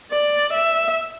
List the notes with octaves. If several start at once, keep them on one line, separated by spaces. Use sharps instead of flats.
D5
E5